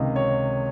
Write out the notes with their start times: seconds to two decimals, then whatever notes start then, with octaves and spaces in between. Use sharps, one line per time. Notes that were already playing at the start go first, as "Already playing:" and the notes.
Already playing: C#2 C3 D#3 D#5 F5
0.16 C#5